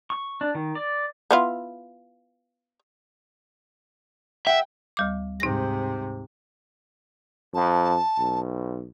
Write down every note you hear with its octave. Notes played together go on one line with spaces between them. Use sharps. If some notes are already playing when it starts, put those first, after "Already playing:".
C#6
D4
D#3
D5
B3 E4 F4
E5 F#5 G5
D2 G3 D6
G#2 C3 D#4 A#6
F2 A5
B1